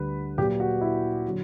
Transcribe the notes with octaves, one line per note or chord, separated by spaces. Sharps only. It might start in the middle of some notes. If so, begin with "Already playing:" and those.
Already playing: D2 D3 G3 B4
A#2 F#3 G4
F#4
E4
D3 F#3